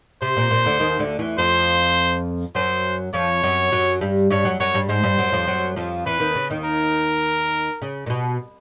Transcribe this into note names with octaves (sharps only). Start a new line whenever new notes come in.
C3 C5
A#2
A#2
D2 D3
D#2 D#3
D2 D3
E2 E3
F2 F3 C5
F#2 F#3 C5
F2 F3 C#5
F#2 F#3
F#2 F#3
G2 G3
G2 G3 C#5
F#2 F#3
F#2 F#3 C#5
G2 G3
G#2 G#3 C5
G2 G3
F#2 F#3
F2 F3
F#2 F#3
F2 F3
E2 E3 B4
D#2 D#3
C#3
D#2 D#3
A#4
C#3
A#2
B2